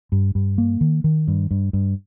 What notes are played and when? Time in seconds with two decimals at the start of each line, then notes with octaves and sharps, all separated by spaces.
0.12 G2
0.35 G2
0.58 A#3
0.81 D#3
1.04 D#3
1.28 G2
1.51 G2
1.73 G2